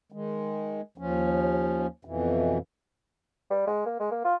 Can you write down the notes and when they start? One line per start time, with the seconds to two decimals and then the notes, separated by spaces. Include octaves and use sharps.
0.12 D#3 G#3
0.98 D#2 F3 C#4
2.05 F2 B2 E3
3.50 G3
3.67 G#3
3.86 A#3
3.99 G#3
4.11 A#3
4.24 F4